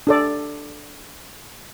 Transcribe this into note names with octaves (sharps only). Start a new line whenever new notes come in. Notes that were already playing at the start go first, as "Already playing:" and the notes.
D4 A4 D5